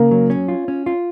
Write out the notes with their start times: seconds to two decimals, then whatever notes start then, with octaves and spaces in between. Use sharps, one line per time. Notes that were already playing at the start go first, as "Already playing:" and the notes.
Already playing: C#3 A#3
0.11 F#3
0.30 C#4
0.48 F4
0.68 C#4
0.86 F4